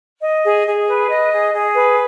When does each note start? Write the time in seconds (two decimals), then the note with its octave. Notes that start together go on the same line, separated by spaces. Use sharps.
0.22 D#5
0.45 G#4
0.66 G#4
0.87 B4
1.09 D#5
1.32 G#4
1.53 G#4
1.74 B4